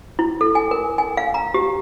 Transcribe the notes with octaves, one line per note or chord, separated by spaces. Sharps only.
E4
A4
G#5
A#4
G#5
F5
A#5
G4